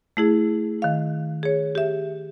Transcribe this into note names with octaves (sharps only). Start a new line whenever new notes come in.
A3 E4 G#4
D#3 F5
G#4 C#5
G4 E5